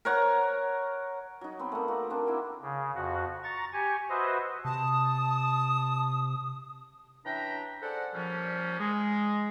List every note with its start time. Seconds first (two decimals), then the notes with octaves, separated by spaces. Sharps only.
0.05 A#4 C#5 F#5
1.41 F#3 D#4
1.59 B3 C4 B4 F#5
1.72 A3 A#3
1.88 F#4
2.10 A#3 C4 D4
2.27 E4 G5
2.62 C#3
2.95 F2 F#4
3.44 A#5 C#6 A6
3.73 G4 G#5 C#6
4.09 F#4 B4 C5 D#5 E5
4.65 C3 A5 D#6
7.25 E3 C#4 D4 E5 G5 A#5
7.82 G#4 A4 C5 D5 F#5
8.13 A#2 F3 G3 C#4
8.79 G#3